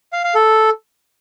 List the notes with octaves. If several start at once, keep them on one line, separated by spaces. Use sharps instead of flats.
F5
F5
A4